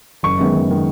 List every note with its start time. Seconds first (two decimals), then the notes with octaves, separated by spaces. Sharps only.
0.23 F#1 C#6
0.38 F#2 D#3 G#3 B3
0.54 F#1
0.70 D#3 G#3 B3